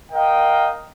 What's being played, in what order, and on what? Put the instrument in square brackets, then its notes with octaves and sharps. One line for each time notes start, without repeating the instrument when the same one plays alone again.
[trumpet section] A#4 D#5 F5 G5